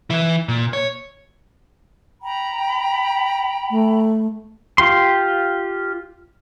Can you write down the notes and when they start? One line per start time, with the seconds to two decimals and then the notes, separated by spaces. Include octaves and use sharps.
0.10 E3 E4
0.48 A#2
0.73 C#5
2.22 G5 A#5 B5
3.70 A3
4.78 F4 G4 C6